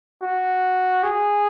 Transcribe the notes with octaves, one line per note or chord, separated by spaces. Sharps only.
F#4
G#4